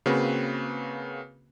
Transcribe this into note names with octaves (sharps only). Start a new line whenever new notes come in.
C#3 A#3 C4 F#4 B4